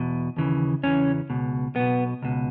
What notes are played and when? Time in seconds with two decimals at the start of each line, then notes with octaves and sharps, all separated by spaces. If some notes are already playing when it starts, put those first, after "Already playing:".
Already playing: E2 B2
0.37 D#2 C#3 E3
0.83 E2 C#3 E3 C#4
1.30 C#2 B2
1.76 B1 B2 B3
2.22 C#2 B2